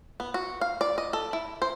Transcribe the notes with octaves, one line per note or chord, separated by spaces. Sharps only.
B3
F#4
F5
D5
D#5
A4
E4
C5